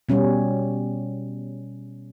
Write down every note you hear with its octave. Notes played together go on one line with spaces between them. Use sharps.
B2 G3 C#4